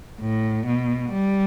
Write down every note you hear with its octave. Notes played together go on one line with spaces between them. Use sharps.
A2
B2
G3